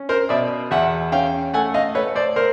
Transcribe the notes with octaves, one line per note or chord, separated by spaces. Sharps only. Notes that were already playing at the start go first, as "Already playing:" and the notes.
Already playing: C#4
A#4 C5
B2 D5 E5
E2 E5 F#5
C#4 F5 G5
A3 F#5 G#5
D#5 F5
A3 B4 C#5
C5 D5
A#4 C5